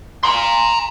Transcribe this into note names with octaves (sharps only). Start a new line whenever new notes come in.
A#5 C6